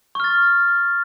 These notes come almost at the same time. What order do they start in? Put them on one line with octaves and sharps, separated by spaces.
C#6 F6 A6